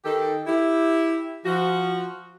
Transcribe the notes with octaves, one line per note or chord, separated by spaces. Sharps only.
D#3 D#4 G4 A4
E4 G4
F3 F#4